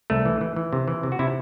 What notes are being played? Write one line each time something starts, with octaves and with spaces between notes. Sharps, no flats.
C2 A3
E3
E3
E3
C3
E3
C3
F#4
C3 E4